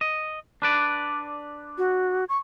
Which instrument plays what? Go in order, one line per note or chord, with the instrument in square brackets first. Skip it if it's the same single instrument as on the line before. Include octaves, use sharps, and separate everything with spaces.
[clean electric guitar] D#5
D4 B4 D5
[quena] F#4
C#6